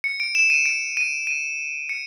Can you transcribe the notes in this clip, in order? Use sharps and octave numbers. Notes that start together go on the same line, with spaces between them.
C#7
D7
E7
D#7
D7
D#7
D#7
C#7